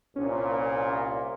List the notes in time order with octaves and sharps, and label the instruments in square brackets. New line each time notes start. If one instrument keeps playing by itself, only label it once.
[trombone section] C2 A#2 [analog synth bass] C#4